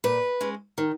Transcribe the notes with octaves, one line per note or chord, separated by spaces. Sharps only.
A#2 B4
G#3 C#4
D#3